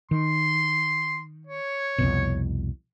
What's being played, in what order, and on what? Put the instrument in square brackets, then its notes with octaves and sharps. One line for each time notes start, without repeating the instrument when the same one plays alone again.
[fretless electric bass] D#3 [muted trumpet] C6
[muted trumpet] C#5
[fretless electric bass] C2 F2 B2